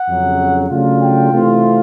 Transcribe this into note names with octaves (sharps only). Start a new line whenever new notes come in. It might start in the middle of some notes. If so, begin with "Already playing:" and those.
Already playing: F#5
F2 C#3 F#3
C#3 F#3 A3 D4 F4
G5
C3 E3 A3 C4 F4